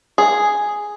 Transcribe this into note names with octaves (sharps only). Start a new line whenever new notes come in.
G#4